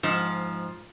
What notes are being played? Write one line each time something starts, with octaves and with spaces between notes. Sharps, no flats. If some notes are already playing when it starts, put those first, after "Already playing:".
G#2 F3